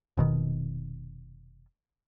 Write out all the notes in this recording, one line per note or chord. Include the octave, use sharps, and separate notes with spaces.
F1 B2 D#3